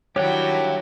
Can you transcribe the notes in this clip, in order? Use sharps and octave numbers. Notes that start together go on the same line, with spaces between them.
G2 D#3 F#3 E4 G4 C#5 F#5 G5